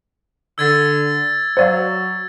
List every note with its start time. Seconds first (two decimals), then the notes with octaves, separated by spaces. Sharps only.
0.58 D3 E6 G#6 A6
1.57 F#3 C5 D5 F5